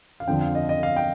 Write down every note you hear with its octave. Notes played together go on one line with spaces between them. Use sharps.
F5
F2 D3 F3 C4 G5
F5
D#5
D#5
F5
G5